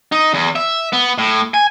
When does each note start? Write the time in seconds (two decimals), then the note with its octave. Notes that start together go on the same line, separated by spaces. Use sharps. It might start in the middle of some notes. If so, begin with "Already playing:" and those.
0.12 D#4
0.34 E2
0.56 E5
0.93 B3
1.18 A2
1.54 G#5